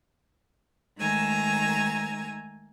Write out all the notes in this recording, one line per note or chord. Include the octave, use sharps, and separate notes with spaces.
D#3 G#3 A3 G#5 A#5 E6